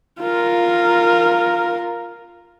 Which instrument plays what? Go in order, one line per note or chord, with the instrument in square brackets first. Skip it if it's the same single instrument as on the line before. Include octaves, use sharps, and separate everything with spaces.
[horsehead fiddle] F4 A#4